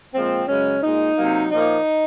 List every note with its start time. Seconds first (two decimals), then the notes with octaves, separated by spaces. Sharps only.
0.14 A#2 F3 G#3 C4
0.48 F#2 C#3 G#3 C#4
0.83 A#2 G#3 D#4
1.17 C3 F#3 A#3
1.51 A#2 F3 A#3 D#4